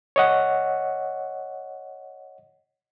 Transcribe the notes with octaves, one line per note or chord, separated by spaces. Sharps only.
C#5 D#5 F#5